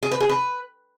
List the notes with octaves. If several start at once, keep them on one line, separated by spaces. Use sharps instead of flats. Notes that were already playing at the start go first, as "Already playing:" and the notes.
G#4
B4
G#4
B4